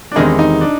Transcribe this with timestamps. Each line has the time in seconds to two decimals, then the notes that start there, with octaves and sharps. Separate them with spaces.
0.12 D4
0.16 E2 C3 D#3 G#3 D#4
0.39 D#4
0.61 D4